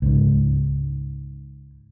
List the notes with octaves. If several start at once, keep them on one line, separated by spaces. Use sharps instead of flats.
C#2 G#2